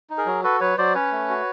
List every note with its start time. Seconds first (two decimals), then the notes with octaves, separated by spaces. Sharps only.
0.10 D#4
0.18 G#4 A#4
0.26 F#3
0.43 F#4 A4 B4
0.61 F#3 B4 C#5
0.78 F#3 C5 D5
0.95 C#4 B4 C#5
1.12 A3
1.30 F#4